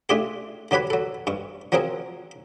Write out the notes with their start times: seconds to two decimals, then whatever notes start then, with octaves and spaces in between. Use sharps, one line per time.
0.09 A3 D4 F4 G4 G#4
0.71 D3 F#3 G4 B4 C#5
0.90 F#3 A4
1.27 G2 C#6
1.72 F3 F#3 C4 G#4 A#4